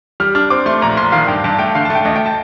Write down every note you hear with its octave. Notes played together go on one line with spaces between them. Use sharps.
G3 F6
D4 F6
C4 D6
A3 C6
A#1 A#5
A#1 C6
D#3 F5
G2 G5
G2 A5
A3 G5
D3 F5
A3 A5
G5
D2 D#5
G5
A5